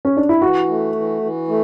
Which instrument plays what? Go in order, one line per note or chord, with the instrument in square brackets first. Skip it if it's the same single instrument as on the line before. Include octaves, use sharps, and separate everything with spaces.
[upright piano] C#4
D4
E4
[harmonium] E3 [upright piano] F#4
[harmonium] A3
E3
E3
A3